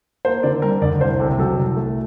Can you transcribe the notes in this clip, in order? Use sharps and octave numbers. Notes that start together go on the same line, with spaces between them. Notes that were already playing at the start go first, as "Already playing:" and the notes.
A#3 C5
D3 D5
G3 A#4
D2 D5
C2 C5
C3 A4
F#3 A4
C2
A3